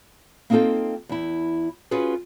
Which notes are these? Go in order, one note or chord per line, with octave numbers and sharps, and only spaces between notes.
A#3 C4 D#4 F4 A4 G5
E2 E4
C#4 F4 F#4 G#4 B4